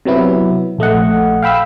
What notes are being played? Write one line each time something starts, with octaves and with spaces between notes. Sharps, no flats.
C3 F#3 B3 E4
A#1 A3 D#5 F#5
F5 G5 B5 E6